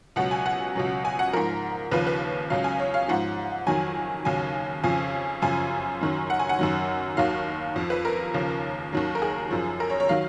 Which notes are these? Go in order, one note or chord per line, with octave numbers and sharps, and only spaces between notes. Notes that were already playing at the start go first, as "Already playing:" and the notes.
C#2 B2 F#3 F#5
G#5
F#5
C#2 B2 F#3
G#5
F#5
G#2 F3 A#4
D#2 C#3 F3 B4
B4
C#2 C#3 F#3 F5
G#5
C#5
F5
G#2 F3 F#5
F2 D#3 F#3 G#5
D#2 C#3 F#3 G#5
F2 C#3 F3 G#5
F#2 C#3 F3 G#5
F#2 D#3 F#3
F#5
G#5
F#5
F#2 D#3 F#3
D#2 D#3 F#3 F5
F2 F3
B4
A#4
D#2 C#3 F3
D#2 D#3 F#3
A#4
G#4
F#2 F3
A#4
C#5
C#5
D#3 F#3 F5